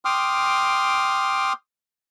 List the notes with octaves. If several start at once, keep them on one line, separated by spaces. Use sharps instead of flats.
G5 C6 D6 D#6 F6